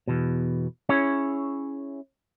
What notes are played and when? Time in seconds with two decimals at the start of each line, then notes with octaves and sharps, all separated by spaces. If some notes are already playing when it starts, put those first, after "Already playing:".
0.08 E2 B2
0.89 C#4 E4 G#4 C#5